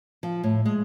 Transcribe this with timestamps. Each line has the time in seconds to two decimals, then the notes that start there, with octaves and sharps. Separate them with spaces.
0.23 F3
0.43 A2
0.65 G#3